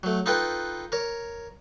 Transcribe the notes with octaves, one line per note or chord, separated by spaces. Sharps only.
F#3 A3
D#4 F4 A4 B4 G5
A#4 C#5